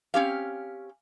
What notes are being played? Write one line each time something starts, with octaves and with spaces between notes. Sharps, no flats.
C4 C#4 G4 F5